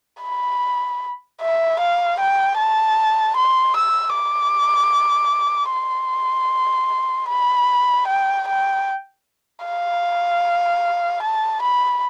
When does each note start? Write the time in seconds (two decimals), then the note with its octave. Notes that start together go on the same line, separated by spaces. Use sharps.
0.23 B5
1.41 E5
1.80 F5
2.20 G5
2.58 A5
3.37 C6
3.76 E6
4.15 D6
5.73 C6
7.29 B5
8.08 G5
8.48 G5
9.65 F5
11.23 A5
11.62 B5